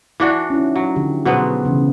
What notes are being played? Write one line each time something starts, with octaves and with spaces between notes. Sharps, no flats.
E3 D4 F#4
C#4 D#4 E4
F#3
D3 F3 G4
B2 F#3 B3 G#4 B4 C5
C#3 E3